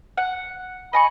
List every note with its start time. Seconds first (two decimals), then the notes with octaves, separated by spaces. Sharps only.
0.17 F#5
0.93 D#5 G#5 B5 C#6